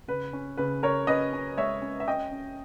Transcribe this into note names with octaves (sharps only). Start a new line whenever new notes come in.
C#3 B4
C#4
C#3 B4
C#3 A#4 C#5
C#4 B4 D#5
C#4
G#3 C#5 E5
C#4
E5
C#4 D#5 G5
C#4